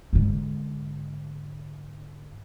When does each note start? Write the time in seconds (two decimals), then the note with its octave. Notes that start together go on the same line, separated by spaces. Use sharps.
0.13 G#2 D3